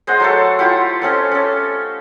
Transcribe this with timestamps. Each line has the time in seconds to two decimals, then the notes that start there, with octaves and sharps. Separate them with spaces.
0.07 G#3 C5 D#5 F#5
0.20 F#3 A3 A4
0.59 E4 F4 G4 F#5
1.02 A3 C4 C#4 D#5
1.32 C#4 A4